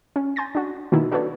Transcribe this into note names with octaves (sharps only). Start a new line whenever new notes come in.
C#4
G#5 C6 G6 A6 A#6
D4 F#4
B2 D#3 A#3 D#4 E4
D4 F#4 A4 B4 C#5 D5